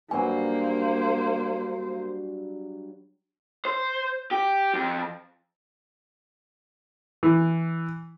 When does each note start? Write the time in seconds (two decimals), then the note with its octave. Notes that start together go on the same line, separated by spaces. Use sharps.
0.11 G2 F#3 A#3 C5 G#5
3.65 C5
4.31 G4
4.74 F2
7.23 E3